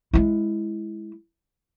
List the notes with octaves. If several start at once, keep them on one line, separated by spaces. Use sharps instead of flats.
G#3 E4